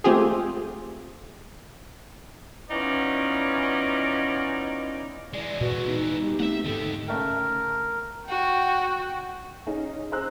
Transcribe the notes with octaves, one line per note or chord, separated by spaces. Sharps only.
G#3 A3 C4 F4 G4 G#4
E3 B3 C#4 D#4 F4 D5
E3 G#3 D5
A#2 F#4 B4
B3 D#4
G4
A3 C4 E5 F#5
G#2 D3 D#4 G4 A4
C#3 A3 A#4 G5
F#4 G5
C#4 D#4 G#4
G#4 C5 A#5 E6 F#6